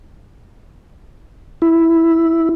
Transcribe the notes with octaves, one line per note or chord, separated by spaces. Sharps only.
E4